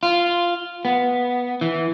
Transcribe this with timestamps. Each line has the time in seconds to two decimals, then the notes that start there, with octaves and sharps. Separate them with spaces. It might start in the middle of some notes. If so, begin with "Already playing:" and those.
0.03 F4
0.85 B3
1.61 E3